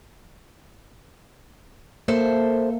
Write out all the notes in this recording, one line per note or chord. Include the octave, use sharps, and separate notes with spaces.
A#3 A4 C5 E5